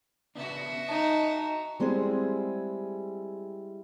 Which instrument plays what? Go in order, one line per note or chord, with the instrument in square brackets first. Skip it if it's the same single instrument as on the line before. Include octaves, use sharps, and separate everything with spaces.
[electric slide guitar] C#3 B3 D4 [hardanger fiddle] F#4 E5
[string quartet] D#4 [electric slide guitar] D#5 G#5 A5
[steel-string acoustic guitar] G3 G#3 C4 E4 G#4